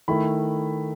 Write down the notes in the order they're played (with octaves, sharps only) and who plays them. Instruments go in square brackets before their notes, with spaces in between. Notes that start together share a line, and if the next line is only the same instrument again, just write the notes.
[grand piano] D#3 A3 E4 B5